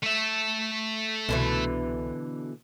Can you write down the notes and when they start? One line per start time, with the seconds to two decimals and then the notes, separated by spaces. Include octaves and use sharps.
0.03 A3 E5
1.29 C2 B2 D3 E3